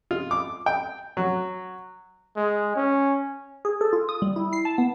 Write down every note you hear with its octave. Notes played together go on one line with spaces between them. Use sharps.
F4
D6
G5
F#3
G#3
C#4
G#4
A4
F4
D#6
G3
E4
C7
A5
B3